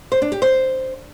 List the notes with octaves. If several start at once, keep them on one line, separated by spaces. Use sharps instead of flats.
C5
D4
G4
C5